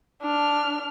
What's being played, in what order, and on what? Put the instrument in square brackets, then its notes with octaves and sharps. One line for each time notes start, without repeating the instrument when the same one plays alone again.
[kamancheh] D4 F6